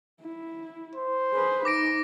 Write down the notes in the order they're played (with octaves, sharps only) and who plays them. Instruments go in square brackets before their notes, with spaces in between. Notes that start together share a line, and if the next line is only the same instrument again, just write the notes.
[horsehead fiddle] E4
[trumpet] C5
[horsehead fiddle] G#4 B4
[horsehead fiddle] D#4 [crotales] D6 A#6 D7